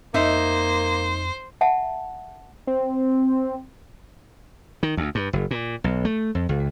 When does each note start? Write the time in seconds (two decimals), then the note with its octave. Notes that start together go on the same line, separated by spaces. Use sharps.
0.14 F2 A#3 D#4 C5 E5
1.61 E5 F#5 A5
2.67 C4
4.83 D#3
4.97 D2
5.15 G2
5.33 F#1
5.51 A#2
5.84 B1
6.05 A3
6.35 F2
6.49 C#2